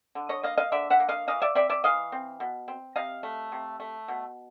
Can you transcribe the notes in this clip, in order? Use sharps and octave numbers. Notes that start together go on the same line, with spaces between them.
D3
C#5 D#5
A#3 D#5 F5
D#5 F5
D3 D5 E5
E5 F#5
A#3
D#5 F5
E3 D#5 F5
D5 E5
C4 D5 E5
D5 E5
E3 D#5 F5
C4
B2
C4
C3 D#5 F5
A3
C3
A3
B2